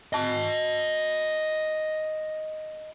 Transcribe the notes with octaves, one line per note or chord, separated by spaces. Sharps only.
D#5 A5